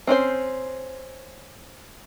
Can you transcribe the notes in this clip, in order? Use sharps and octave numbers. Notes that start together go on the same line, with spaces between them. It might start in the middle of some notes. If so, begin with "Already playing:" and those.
C4 C#4 D#4 C5